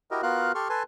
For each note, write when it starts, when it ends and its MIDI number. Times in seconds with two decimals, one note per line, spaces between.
0.11 0.22 64
0.11 0.22 66
0.11 0.22 67
0.11 0.22 70
0.11 0.22 75
0.23 0.52 59
0.23 0.52 65
0.23 0.52 66
0.23 0.52 70
0.23 0.52 77
0.23 0.52 90
0.55 0.68 67
0.55 0.68 69
0.55 0.68 84
0.55 0.68 85
0.55 0.68 89
0.70 0.83 69
0.70 0.83 71
0.70 0.83 80
0.70 0.83 81
0.70 0.83 84